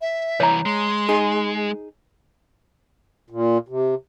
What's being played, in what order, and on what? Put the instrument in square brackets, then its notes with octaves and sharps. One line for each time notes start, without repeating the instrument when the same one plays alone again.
[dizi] E5
[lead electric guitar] C2 E3 [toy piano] C#5 A#5
[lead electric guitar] G#3 [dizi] C6
[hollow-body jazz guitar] D#4 G#4
[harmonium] A#2
C3